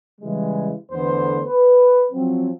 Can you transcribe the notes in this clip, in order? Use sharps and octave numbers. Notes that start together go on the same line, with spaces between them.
C#3 E3 G3 G#3
E2 D3 A3 B3 C5
B4
F3 F#3 C4